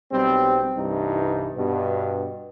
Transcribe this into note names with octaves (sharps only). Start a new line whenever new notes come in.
B1 G3 C4
C2 G2 E3 D#4
G2 B2